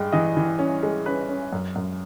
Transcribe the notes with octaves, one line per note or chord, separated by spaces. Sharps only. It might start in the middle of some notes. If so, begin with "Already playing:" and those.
Already playing: G2 G#3 G5
E3 D#5
E3
C#4
G#3
C#4 B4
C#4
F#2
F#2